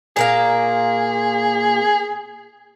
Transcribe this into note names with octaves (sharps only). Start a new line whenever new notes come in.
A#2 A#3 G#4 F5